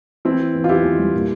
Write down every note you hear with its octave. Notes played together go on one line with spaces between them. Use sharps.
E3 C4 E4
E3
E2
F4
E2 E4 G4
E2
G3
A#2